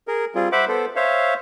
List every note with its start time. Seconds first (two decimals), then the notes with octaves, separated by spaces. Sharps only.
0.08 G#4 A#4
0.35 G3 C4 F4 G#4
0.52 C5 E5 F#5 B5 D6
0.68 B3 A4 C5
0.96 C5 C#5 E5 F5